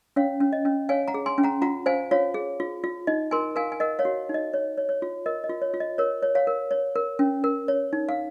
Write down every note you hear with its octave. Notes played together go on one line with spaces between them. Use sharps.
C#4 C#5 F5
C#4
D#5
C#4
C#5 F5 G#5
F#5 A#5
G#4
G#5 C6
C#4
F#5 A#5
F4 F#5 A#5
C5 F5 G#5
F4 C#5 F5
G#4
F4
F4
D#4 D#5
A#4 G#5 C6
A#4 F5 G#5
G#5
A#4 D#5 F#5
C#5 F5
F#4
D#4
D#5
C#5
C#5
C#5
F4
A#4 D#5
D#5
F4
C#5
F4
D#5
A#4 C#5
C#5
C#5 F5
A#4
C#5
A#4
C#4
A#4
C#5
D#4
F5